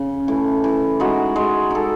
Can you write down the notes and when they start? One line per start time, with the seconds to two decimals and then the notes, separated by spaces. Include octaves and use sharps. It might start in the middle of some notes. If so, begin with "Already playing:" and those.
Already playing: C#3
0.28 E3 A3
0.64 E3
1.00 G#3 D#4 F#4
1.36 G#3
1.70 D#4 A4